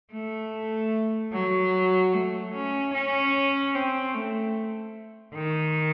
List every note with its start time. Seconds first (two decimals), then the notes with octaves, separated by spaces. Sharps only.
0.13 A3
1.33 F#3
2.14 A3
2.54 C#4
2.94 C#4
3.75 C4
4.14 A3
5.34 D#3